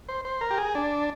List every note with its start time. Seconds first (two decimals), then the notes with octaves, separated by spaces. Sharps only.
0.09 C5
0.25 C5
0.41 A#4
0.50 G4
0.58 G#4
0.75 D4